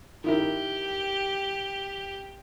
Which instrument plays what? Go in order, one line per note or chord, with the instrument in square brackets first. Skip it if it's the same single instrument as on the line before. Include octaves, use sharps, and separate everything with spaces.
[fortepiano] D#3 E4 A#4 [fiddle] G4